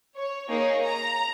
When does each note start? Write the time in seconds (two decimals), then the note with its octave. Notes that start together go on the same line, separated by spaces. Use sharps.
0.16 C#5
0.49 A#3 D#4 G#4 C#5
0.82 A#5